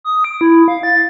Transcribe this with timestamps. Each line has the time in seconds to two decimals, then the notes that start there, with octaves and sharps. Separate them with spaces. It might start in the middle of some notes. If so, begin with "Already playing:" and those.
0.04 D#6
0.24 D7
0.41 E4
0.68 F5
0.83 A6